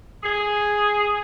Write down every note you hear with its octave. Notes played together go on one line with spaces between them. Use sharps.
G#4